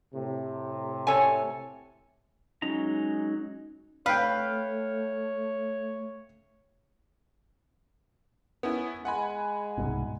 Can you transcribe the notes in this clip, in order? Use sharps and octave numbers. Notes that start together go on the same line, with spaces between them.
A2 C3
A4 C#5 G#5
F#3 G#3 C#4 D#4 A#5
A3 B4 C#5 F5 G5
B3 C#4 E4
G#3 F#5 G#5 B5
C2 G#2 B2